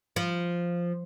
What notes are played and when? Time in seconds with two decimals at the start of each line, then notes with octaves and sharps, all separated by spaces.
0.16 F3